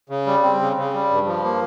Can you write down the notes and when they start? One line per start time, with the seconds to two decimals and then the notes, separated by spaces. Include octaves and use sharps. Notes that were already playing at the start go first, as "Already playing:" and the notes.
0.09 C#3
0.26 G3
0.43 C4
0.60 C#3
0.76 C#3
0.93 G3
1.10 G2
1.27 F3
1.44 A#3